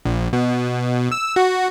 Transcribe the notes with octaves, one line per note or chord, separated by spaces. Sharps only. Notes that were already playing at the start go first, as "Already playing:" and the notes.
A#1
B2
E6
F#4